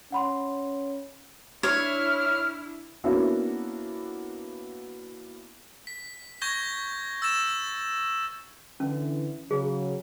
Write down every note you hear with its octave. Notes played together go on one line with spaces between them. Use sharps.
C#4 F#5 B5 C6
D4 E4 C#5 F6
A#3 B3 C#4 D4 E4 F#4
B6
C#6 G6 G#6 A#6 G7
E6 A6 E7
D3 E3 C#4
C#3 F#3 G#4